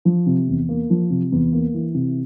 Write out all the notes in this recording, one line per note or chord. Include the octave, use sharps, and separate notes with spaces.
F3
C3
E2
A#3
F3
C3
E2
A#3
E3
C3